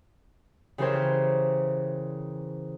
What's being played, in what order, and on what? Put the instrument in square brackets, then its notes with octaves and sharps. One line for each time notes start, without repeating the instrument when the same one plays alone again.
[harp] C#3 E3 G4 A#4 C5 C#5